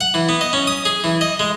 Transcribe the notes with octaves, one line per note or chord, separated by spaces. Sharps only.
F#5
E3
B3
D#5
C#4
D#6
G#4
E3
D#5
G#3